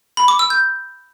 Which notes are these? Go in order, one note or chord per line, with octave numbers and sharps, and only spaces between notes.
B5
D6
E6
G6